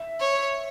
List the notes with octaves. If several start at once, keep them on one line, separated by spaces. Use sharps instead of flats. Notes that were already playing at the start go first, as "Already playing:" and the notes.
Already playing: E5
C#5